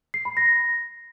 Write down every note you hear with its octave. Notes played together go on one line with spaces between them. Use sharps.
C7
B5
A#6